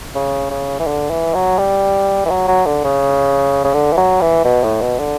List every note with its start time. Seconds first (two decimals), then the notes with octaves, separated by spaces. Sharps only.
0.15 C#3
0.50 C#3
0.80 E3
0.87 D3
1.10 E3
1.34 F#3
1.59 G3
2.25 E3
2.30 F#3
2.48 F#3
2.66 D3
2.84 C#3
3.64 C#3
3.74 D3
3.93 E3
3.97 F#3
4.21 E3
4.45 B2
4.64 A2
4.81 B2
4.99 D3